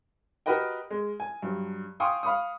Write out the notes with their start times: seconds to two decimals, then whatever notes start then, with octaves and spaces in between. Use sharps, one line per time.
0.46 F#4 G4 A#4 B4 D#5 G5
0.90 G#3
1.20 G#5
1.42 G2 F#3
2.00 F5 G5 G#5 C6 C#6 D#6
2.23 F5 B5 C#6 D#6